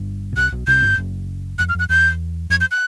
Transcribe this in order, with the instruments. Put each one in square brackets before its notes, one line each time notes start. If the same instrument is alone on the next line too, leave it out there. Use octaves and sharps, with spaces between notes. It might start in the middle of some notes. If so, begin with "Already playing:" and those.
Already playing: [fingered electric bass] G1 G2
B2
[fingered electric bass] C2 C3 [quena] F#6
[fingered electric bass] B1 B2
[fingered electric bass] C2 C3 [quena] G6
[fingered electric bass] G1 G2
F#1 F#2
[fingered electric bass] F2 [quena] F#6
[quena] F6
[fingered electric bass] F2 [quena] F#6
[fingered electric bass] E2 [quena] G6
[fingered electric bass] F2 [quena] G#6
[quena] G6
F#6